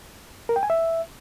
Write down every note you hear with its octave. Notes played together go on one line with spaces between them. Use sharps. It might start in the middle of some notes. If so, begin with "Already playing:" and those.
A#4
G5
G#5
E5